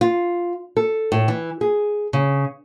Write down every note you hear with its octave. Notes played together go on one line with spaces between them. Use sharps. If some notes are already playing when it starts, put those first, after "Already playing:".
F4
A4
A2
E3
G#4
C#3